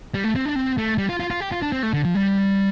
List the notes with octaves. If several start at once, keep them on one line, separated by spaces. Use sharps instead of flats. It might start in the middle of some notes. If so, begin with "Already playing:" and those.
G3
A3
C4
D4
C4
A3
G3
F4
F4
F4
G4
F4
D4
C4
A3
D3
F3
G3